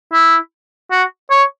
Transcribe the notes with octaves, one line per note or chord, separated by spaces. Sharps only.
E4
F#4
C#5